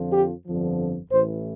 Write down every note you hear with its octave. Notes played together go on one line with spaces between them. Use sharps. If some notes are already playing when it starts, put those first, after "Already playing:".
Already playing: F2 D3 F3
G4
G1 F2 D3 F3
A1 A2 E3 C5